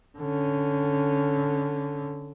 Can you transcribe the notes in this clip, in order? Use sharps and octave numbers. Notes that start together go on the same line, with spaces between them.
D3 C#4